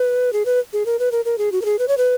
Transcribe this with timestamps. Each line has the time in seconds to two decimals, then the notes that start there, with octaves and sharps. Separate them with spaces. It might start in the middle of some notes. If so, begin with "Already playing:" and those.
Already playing: B4
0.33 G#4
0.46 B4
0.73 G#4
0.86 A#4
0.99 B4
1.12 A#4
1.25 A#4
1.38 G#4
1.52 F#4
1.62 A#4
1.65 G#4
1.79 B4
1.88 C#5
1.98 B4